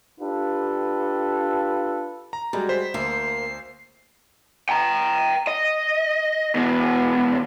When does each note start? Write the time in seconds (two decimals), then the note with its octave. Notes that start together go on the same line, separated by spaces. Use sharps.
0.21 D4 F4 G4 A4 B4
2.33 A#5
2.53 F#2 G3 G#3
2.69 C5 B6
2.94 D2 A#3 C7
4.69 G5 A#5
5.47 D#5
6.55 E2 B2